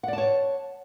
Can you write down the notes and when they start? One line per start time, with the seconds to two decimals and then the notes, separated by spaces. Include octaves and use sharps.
0.03 F#5
0.08 D5
0.13 A5
0.18 C#5